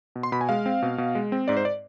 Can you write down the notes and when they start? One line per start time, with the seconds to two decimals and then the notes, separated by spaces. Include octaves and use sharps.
0.16 B2
0.23 C6
0.32 B2 B5
0.41 G#5
0.49 G#3 F5
0.66 C4
0.82 B2
0.98 B2
1.15 G#3
1.32 C4
1.48 G#2 D5
1.57 C5
1.65 D5